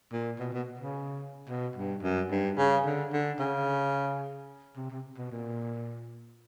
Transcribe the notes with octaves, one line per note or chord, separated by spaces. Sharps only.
A#2
B2
B2
C#3
B2
G2
F#2
G2
C#3
D3
D3
C#3
C3
C3
B2
A#2